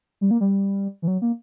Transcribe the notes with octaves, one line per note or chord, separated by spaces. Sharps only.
G3
A#3
G3
E3
F#3
A#3